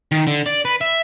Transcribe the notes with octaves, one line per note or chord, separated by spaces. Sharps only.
D#3
D3
D5
B4
E5